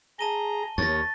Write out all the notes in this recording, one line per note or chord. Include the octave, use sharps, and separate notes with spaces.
G#4 A5 A#5 D#7 G7
D#2 C#5 A6 A#6